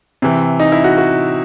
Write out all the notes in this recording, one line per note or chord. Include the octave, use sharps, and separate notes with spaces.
C3 E3
D#4
E4
F#4
F#4